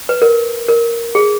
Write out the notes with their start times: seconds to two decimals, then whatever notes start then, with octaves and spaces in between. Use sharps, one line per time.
0.09 B4
0.22 A#4
0.68 A#4
1.15 G#4